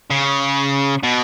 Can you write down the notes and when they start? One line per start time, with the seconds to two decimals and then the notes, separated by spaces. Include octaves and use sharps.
0.10 C#3
1.03 B2